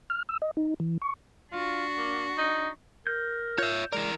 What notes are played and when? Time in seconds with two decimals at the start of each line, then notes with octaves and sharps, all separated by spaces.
0.10 F6
0.29 E6
0.42 D#5
0.57 D#4
0.80 E3
1.02 C#6
1.52 D4 F4 F#4
1.98 A#3
2.38 D#4
3.07 A#4 G6
3.58 F4 C#5 E5 G6
3.93 E3 G#3 A#4 D5